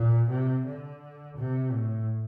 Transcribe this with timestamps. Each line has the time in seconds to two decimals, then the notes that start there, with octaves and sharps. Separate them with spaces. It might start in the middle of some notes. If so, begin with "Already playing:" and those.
Already playing: A#2
0.30 C3
0.66 D3
1.37 C3
1.72 A2